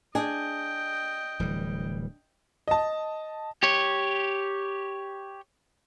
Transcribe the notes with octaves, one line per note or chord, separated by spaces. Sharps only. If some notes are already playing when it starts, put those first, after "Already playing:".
D4 G#4 D#5 G5
D1 E3 G3
D#5 A5
G4 C#5